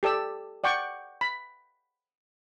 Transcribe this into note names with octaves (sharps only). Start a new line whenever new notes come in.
G4 A4 D5 E6
D5 F#5 G5 C#6
B5